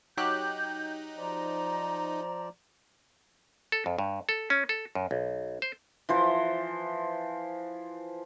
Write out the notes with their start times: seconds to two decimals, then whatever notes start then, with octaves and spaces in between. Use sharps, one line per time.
0.17 F#3 D#4 G4 F#6 G6
1.18 F3 C5 D5 A#5
3.72 A4
3.86 F2
3.99 G2
4.29 A4
4.50 C#4
4.69 A4
4.95 F#2
5.11 B1
5.62 C5
6.09 E3 F3 C5